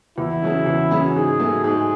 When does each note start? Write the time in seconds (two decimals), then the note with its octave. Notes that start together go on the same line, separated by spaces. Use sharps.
0.18 E2 E4
0.42 C#3 F#3 C#4 G#4
0.66 E2
0.91 C#3 F#3 C#4 G#4
1.15 G#2 G#4
1.39 F#3 A3
1.64 G#2 G#4